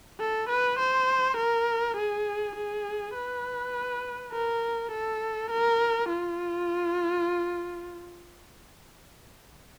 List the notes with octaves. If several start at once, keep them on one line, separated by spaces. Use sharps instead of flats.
A4
B4
C5
A#4
G#4
G#4
B4
A#4
A4
A#4
F4